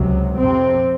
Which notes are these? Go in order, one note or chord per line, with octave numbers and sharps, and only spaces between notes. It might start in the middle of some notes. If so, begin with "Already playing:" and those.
Already playing: C#2 C3 F#3
F2 C3 C4